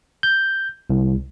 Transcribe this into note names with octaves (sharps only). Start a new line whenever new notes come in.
G6
C2